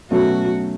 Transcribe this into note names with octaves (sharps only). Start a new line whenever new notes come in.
B2 F#3 A3 C#4 F#4